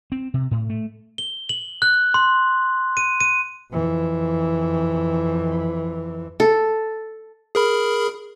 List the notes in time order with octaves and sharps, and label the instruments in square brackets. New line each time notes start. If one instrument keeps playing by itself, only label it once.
[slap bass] C4
C3
A2
A3
[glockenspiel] G7
F#7
F#6
C6
D#7
D#7
[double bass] F2 E3
[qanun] A4
[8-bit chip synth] G#4 A#4 B5